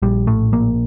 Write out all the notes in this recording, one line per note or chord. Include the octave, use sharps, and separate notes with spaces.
A#1 G3
A2 A3
A#1 A#3